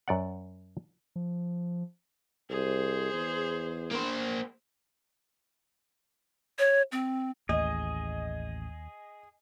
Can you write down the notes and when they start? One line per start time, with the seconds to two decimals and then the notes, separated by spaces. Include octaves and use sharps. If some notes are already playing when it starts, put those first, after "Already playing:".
0.08 F#2 D5 F#5
1.16 F3
2.50 C2 G#4 C5
3.14 E2
3.91 A#3 C5
6.59 C#5
6.92 C4
7.49 A1 D#2 G#4 D#5